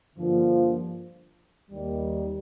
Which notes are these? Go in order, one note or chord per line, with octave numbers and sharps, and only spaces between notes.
G2 D3 F3 A#3
D#2 D#3 G3